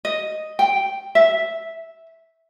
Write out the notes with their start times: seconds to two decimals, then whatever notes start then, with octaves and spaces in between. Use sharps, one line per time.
0.05 D#5
0.59 G5
1.15 E5